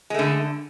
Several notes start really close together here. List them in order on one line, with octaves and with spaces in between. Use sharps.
G#3 A3 D3